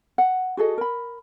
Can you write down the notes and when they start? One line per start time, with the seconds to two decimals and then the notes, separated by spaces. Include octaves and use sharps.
0.18 F#5
0.57 F#4 G#4 A4 D#5
0.78 A#4 B5